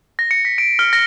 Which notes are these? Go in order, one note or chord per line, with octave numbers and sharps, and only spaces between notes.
A#6
C#7
B6
D7
F6
A#6